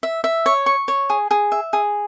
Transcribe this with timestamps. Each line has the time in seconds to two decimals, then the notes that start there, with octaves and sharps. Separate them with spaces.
0.03 E5
0.24 E5
0.46 C#5
0.66 C#6
0.88 C#5
1.10 G#4
1.31 G#4
1.52 E5
1.73 G#4